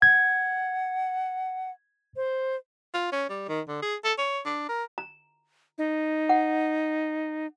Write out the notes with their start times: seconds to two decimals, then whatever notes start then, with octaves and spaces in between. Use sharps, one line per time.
0.02 F#5 G#6
2.16 C5
2.94 F4
3.12 C#4
3.30 G3
3.49 D#3
3.68 D3
3.82 G#4
4.04 A4
4.18 C#5
4.45 D4
4.69 A#4
4.98 A#5
5.78 D#4
6.29 F#5